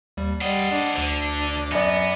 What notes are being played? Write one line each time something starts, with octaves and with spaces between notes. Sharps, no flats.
D#2 G3
G3 C5 D5 D#5 F#5
D4
D2 D3 D6
F#2 B3 D5 A#6